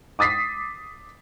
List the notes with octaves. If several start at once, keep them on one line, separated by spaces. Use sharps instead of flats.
D6 D#6 A6 B6 C7